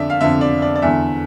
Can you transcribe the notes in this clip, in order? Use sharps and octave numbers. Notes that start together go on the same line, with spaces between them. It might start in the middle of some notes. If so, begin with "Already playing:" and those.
Already playing: F2 D3 D5 E5
F5
F2 D3 E5
D5
D5
D5
E2 D3 E5